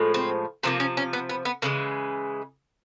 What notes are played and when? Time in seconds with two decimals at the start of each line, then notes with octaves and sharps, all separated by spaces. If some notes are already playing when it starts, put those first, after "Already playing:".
Already playing: A2 F3 G#3
0.14 C4
0.63 C3 F3 A#3 C4
0.80 C#4
0.97 C#4
1.13 B3
1.29 B3
1.45 B3
1.62 C#3 E3 G#3 A#3